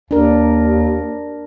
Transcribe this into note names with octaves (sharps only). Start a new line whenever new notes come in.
D#2 D4 A#4